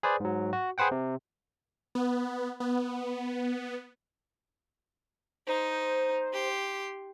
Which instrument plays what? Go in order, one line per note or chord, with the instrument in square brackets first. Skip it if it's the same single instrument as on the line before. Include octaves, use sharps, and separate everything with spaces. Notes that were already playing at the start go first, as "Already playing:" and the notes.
[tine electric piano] G#4 B4 C5 D5
G#2 F#3
F#4
G#4 B4 C5 F#5 G5
C3
[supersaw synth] B3
B3
[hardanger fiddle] D#4 [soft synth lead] C5
[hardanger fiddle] G4 C6